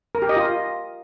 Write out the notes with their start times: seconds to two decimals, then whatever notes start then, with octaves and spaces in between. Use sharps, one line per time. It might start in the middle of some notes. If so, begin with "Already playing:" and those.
0.15 A#4
0.22 G4
0.29 D#5
0.37 F4